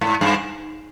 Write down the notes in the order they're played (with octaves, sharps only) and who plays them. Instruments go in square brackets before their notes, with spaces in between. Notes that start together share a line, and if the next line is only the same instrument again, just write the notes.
[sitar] G#2
G2